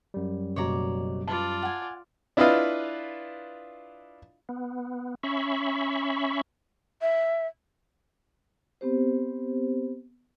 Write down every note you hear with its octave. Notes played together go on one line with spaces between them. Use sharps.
F#2 G3
F#1 B2 C#5 D5 A#5
F4 B4 D5 A5
F#5 G#5
D4 E4 F4 B4 D#5 F5
B3
C#4 E5 B5 C#6
E5
B3 C4 G4 C5